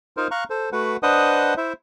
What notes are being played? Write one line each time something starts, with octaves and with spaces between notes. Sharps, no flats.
D#4 F4 A#4 C5
F5 A#5 C#6 F#6
A4 C5
A3 F#4 B4 F#5
D4 B4 C5 D#5 F#5 D#6
E4 C5 E5